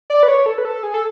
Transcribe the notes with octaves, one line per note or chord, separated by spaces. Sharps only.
D5
B4
C#5
A4
B4
A4
G#4
A4